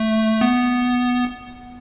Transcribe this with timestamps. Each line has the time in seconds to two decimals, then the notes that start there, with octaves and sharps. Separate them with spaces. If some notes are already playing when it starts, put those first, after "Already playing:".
Already playing: A3
0.41 B3